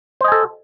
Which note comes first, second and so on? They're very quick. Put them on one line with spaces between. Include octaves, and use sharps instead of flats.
C5 D#5 G#5 A4